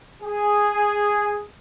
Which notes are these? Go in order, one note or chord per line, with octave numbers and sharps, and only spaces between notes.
G#4